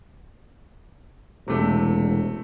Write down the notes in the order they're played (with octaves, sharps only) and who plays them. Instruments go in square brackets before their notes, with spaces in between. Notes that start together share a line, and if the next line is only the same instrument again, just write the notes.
[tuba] E1 [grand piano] C3 A3